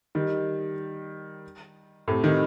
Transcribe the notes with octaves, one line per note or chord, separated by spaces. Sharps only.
D#3 G3
A2 C3
C3 D#3